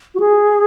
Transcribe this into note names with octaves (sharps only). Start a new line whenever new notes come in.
F#4
G#4